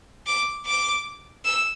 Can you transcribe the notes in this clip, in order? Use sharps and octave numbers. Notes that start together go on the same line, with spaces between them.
D6
D6
E6